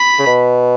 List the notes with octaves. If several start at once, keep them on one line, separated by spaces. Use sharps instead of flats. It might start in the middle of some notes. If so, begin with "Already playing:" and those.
Already playing: B5
C#3
B2